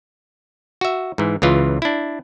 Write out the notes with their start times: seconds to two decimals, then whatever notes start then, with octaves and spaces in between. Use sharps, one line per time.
0.81 F#4 E5
1.18 G#2 E3
1.42 C#2 C#3 E3 F4
1.82 D4 E4